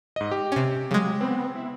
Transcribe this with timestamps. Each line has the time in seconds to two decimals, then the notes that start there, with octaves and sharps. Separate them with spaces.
0.16 G#2 D#5
0.31 G4
0.52 C3 C#4
0.91 C#3 F#3 G#3
1.21 B3 C4
1.55 E4